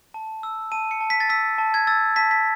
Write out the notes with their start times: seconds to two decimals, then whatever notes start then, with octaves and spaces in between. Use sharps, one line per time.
0.14 A5
0.43 E6
0.72 A5 D#7
0.91 C#7
1.01 A5
1.10 B6
1.20 A6
1.29 E6 B6
1.58 A5
1.74 G#6
1.87 E6 A6
2.16 A5 B6
2.31 B6